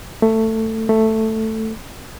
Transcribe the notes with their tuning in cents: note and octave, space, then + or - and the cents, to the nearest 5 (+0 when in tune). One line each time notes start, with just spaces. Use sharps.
A3 +15
A3 +5